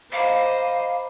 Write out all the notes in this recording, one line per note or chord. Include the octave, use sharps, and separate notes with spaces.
C5 D#5 F5 A#5 B5 D6